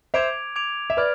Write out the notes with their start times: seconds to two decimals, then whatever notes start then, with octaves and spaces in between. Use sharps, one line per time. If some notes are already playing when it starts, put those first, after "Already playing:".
0.14 C5 E5 D6 G#6 D7 F7
0.56 D6 G#6 D7 F7
0.90 E5
0.97 B4 D5 F6 G#6